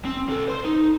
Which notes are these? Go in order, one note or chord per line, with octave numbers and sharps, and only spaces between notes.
C4
C3 A4
C5 C6
D#4